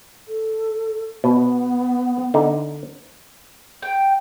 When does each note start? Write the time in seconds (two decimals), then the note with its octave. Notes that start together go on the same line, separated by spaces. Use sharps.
0.28 A4
1.24 B2 B3
2.34 D3 D#4
3.82 G5